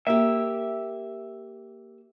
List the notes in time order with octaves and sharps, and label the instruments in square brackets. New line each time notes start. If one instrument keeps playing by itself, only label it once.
[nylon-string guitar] A#3 G4 [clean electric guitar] E5